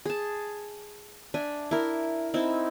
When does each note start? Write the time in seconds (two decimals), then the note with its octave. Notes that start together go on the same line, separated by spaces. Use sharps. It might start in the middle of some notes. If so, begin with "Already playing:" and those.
0.06 G#4 A5
1.34 D4 E5 G#5
1.71 E4 A#4
2.34 C4 D#4 E4